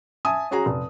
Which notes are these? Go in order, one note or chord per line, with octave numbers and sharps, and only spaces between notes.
E5 G#5 A5 D#6
C#4 F#4 G#4 G#5 A#5
F1